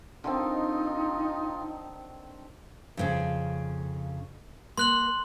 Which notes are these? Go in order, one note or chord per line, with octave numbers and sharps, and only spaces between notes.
D3 D#3 C4 D#4 F4
F2 A#2 C#3
A#3 C6 F#6 F#7